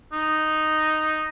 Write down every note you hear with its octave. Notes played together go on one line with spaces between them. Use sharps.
D#4